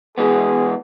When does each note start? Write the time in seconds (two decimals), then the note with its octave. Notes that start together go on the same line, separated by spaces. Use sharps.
0.18 E3 G#3 B3 G#4